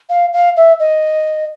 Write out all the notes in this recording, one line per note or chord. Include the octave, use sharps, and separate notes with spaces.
F5
F5
E5
D#5